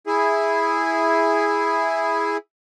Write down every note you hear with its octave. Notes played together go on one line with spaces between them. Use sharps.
E4 G#4